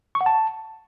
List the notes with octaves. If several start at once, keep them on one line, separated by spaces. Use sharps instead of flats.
C#6
F#5
A5